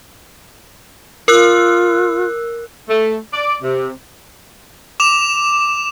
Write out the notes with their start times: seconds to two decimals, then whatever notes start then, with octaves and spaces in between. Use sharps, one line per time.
1.28 F4 A#4 E6 F#6
2.89 A3
3.33 D5
3.63 C3
5.00 D6 E7 F7